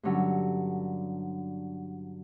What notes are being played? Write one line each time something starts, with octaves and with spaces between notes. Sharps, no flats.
G2 D3 F#3 C#4